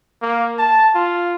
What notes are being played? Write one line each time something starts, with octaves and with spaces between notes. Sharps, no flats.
A#3
A5
F4